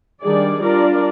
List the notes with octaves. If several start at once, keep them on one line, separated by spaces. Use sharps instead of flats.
D#3 G3 D4 G#4 D5
G3 D4 F4 A#4 D5